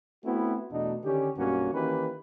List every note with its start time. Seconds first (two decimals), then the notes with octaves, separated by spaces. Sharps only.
0.24 A3 B3 C4 E4 F#4
0.71 E2 B2 A3 D4 D#4
1.04 D3 D#3 C#4 G4
1.36 B1 G2 A#3 C#4 F#4
1.72 D#3 E3 A#3 C#4 G4 B4